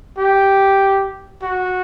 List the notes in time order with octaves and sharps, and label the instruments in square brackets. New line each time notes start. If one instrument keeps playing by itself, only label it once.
[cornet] G4
F#4